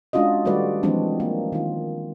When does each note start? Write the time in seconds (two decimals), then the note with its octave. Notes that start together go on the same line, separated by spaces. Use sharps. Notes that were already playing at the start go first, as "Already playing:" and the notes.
0.13 G#3 C#4 D4 F4 F#4 D#5
0.45 D#3 G3 A3 F#4 B4 D5
0.83 E3 F3 G#3 B3 C4 D4
1.20 A#3
1.52 D#3 F4